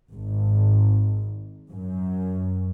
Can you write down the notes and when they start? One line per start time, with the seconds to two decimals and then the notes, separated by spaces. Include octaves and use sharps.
0.14 G#1
1.71 F#2